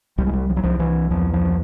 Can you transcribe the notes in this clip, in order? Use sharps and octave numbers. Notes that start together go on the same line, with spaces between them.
C2 G3
G#3
G3
F3
F#3
C2 F3
E3
E2 F3
F3